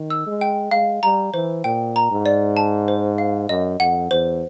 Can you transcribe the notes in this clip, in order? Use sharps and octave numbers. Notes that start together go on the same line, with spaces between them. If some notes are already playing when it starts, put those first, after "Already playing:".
Already playing: D#3
E6
G#3
G5
G#3 F5
G3 A#5
E3 C5
A#2 G5
A#5
G#2
D5
A5
C5
F5
F#2 D#5
F2 F#5
E2 C5